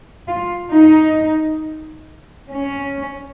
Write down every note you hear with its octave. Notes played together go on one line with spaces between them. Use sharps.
F4
D#4
C#4